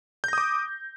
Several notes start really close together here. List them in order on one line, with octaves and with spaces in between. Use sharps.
G6 A#6 D#6 D6